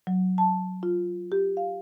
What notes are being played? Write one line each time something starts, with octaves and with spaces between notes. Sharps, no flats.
F#3
A5
F4
G4
F5